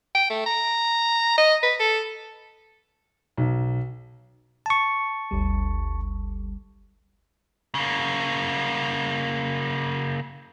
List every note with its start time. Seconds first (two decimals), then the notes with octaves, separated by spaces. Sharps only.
0.15 G5
0.30 A3
0.46 A#5
1.37 D#5
1.63 B4
1.79 A4
3.38 B1
4.66 A5 C#6
5.31 G1 D2 G3
7.75 C#3 A#3